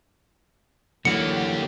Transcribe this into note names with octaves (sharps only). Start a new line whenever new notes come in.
D3 E3 F#3 A#3 G4 F#5 C#7